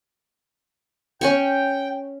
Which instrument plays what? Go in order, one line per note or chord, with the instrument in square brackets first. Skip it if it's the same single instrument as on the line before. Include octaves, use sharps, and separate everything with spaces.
[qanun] C#4 G#5 C#6 [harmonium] G5